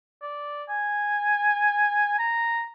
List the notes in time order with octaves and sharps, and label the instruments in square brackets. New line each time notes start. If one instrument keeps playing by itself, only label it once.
[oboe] D5
G#5
A#5